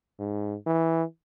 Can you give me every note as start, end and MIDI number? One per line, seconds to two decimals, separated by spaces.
0.19 0.55 44
0.67 1.03 52